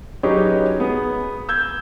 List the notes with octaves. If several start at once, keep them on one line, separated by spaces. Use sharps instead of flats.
F#3 C#4 D#4 G4 G#4 B4
B3 G#4
E6 G6 G#6